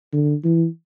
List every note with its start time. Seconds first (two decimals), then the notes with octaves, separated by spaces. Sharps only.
0.13 D3
0.44 E3